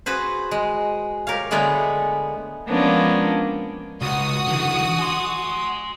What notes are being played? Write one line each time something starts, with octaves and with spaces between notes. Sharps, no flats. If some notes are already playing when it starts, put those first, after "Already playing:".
F#4 G#4 B4 C5
G#3
G4 A#4 C#5 F5
D3 G#3 A3 B3 A#4 C#5
F3 G#3 A#3 B3 C#4 D4
C#2 F#4 D#6
D3 E3
G#5 C6